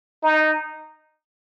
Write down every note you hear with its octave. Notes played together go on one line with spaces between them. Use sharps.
D#4